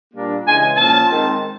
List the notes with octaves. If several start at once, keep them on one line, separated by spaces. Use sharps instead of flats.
A#2 G3 A#3 D4
C#3 E3 G#3 G#5
A#2 F3 A#3 C#4 A5
D#3 G#3 C4